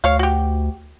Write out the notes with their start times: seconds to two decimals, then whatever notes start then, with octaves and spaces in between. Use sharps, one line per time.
0.04 D2 C#5 F5
0.19 F#4 G4